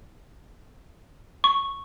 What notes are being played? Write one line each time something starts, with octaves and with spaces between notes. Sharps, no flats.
C#6